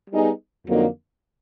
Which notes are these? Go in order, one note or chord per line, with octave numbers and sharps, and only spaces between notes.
G3 B3 D#4 G#4
F2 D3 F#3 A#3 D#4